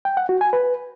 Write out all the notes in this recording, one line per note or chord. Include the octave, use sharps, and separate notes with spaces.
G5
F#5
F#4
G#5
B4